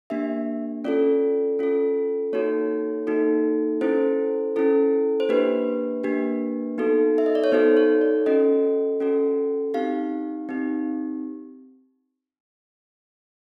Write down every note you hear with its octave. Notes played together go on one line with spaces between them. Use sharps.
A#3 D4 G4 E5
C#4 F4 A4 D5
C#4 F4 A4
A#3 D#4 F#4 A4 C#5
A#3 D#4 F#4 A4
C#4 E4 A4 C5
C#4 E4 A4
C5
A#3 D4 G4 B4
A#3 D4 G4
B3 D#4 F#4 A4
E5
D#5
D5
C#5
B3 D#4 F#4 A4 C5
C#5
D5
C#4 F#4 A4 D#5
C#4 F#4 A4
C4 D#4 G4 F5
C4 D#4 G4